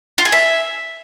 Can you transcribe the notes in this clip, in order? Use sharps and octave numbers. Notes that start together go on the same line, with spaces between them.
F4
G#4
E5